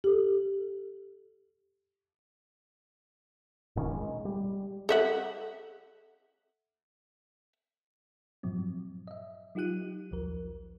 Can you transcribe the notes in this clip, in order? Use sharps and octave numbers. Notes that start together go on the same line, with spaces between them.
G4 A4
D#1 A#2 D#3 C#4
G#3
G3
A4 E5 F#5
G2 A#2 F3 F#3 C4
D#5 E5
F#3 D#4 F4 G4 F#6 D#7
A#1 D#2 F3 A#4